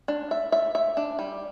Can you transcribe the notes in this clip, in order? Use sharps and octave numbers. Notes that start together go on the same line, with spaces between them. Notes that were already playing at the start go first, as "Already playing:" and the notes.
D4
E5
E5
E5
D4
G3